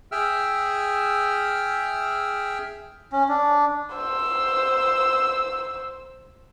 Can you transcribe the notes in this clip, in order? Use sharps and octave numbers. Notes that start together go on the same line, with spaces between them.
G#4 E5 G5 E6 F6
C#4
D4
C5 E6